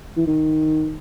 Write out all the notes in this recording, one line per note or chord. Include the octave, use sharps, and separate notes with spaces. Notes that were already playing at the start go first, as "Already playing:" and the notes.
E3
D#3